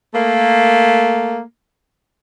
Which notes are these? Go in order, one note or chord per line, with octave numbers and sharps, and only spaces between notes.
A3 A#3